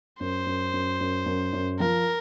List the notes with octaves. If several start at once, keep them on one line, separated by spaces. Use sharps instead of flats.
F#2 C5
F#2
F#2
F#2
F#2
F#2
F3 A#4